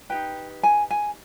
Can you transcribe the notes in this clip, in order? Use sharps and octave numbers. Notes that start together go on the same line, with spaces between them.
D#4 G4 B4 G5
G#5
G#5